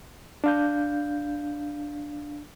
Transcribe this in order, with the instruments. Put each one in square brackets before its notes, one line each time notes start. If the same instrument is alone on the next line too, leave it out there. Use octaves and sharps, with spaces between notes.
[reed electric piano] D4 F5 G6